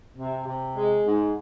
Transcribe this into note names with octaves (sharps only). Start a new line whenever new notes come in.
C3
C3
G#3
G#2